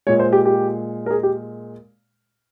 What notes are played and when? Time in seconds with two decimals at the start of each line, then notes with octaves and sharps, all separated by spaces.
0.06 A#2 G#3 C#5
0.19 C5
0.33 G4
0.45 G4
1.06 A#4
1.11 G#4
1.23 G4